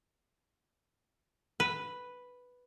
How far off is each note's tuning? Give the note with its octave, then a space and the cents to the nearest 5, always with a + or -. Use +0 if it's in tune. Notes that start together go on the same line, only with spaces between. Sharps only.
B4 +0